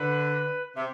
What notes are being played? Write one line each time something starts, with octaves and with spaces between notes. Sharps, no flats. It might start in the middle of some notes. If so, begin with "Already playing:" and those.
Already playing: D3 B4
C3 E5